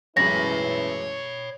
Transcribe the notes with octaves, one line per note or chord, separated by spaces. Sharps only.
A1 F#2 G#3 E4 B4 C#5 B5 A#6